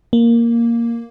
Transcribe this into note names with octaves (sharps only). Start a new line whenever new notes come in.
A#3